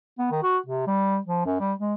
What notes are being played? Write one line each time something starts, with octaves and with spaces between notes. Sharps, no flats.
B3
D#3
F#4
C3
G3
F3
F#2
G3
G#3